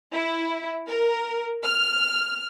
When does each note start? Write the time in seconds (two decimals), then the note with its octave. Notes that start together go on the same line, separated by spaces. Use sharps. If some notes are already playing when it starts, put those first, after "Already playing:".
0.12 E4
0.88 A#4
1.64 F6